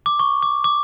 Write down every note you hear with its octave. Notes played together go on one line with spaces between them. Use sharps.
D6
C#6
D6
D6